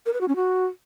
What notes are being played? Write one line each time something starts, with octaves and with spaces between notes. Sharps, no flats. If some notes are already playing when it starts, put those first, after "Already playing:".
A#4
B4
F#4
C#4
F#4